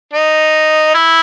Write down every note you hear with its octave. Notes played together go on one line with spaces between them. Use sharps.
D#4
E4